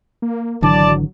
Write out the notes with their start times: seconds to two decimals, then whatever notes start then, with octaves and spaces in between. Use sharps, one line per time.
0.22 A#3
0.62 G#1 D3 E3 F#3 D5 A5